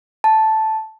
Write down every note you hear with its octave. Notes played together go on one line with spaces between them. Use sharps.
A5